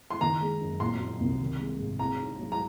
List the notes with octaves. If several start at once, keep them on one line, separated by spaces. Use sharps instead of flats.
C6
D#3 A#5
G#3
F#2
A#2 C6
F#3
C2
D#3
G#3
G#2
C4 A#5
D#4
F#3
A#5